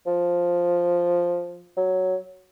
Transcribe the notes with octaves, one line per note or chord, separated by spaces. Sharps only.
F3
F#3